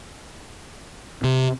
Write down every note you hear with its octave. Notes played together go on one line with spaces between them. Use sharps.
C3